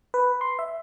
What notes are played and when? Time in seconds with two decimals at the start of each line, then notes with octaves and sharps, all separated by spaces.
0.14 B4
0.41 C6
0.59 E5